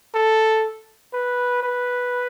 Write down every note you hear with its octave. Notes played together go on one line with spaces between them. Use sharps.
A4
B4
B4